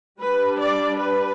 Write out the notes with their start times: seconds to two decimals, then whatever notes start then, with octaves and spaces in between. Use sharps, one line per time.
0.21 G3 D4 B4
0.60 D5
0.98 B4